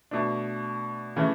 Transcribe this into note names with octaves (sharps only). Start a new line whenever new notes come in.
B2 A3 D4
C#3 E3 A3